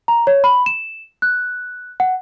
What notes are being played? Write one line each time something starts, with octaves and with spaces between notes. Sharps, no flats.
A#5
C#5
B5
E7
F#6
F#5